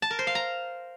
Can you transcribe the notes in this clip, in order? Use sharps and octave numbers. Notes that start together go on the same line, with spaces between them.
A5
A#4
C5
F5
A#5